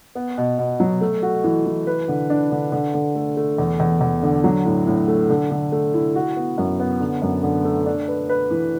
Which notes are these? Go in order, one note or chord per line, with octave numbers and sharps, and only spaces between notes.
B3
B2
B2
F#3
A3
F#4
E3
E3
B4
D3
D4
D3
D3
D3
A3
A3
E2
E2
E2
D3
F#3
A2
A2
A3
D3
D3
A3
E4
F#4
B3
F#2
B3
D3
F#2
D3
A3
D4
B4
B4
E3